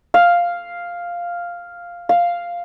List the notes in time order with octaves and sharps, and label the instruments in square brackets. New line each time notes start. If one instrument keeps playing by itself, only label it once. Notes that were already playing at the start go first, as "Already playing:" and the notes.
[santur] F5
F5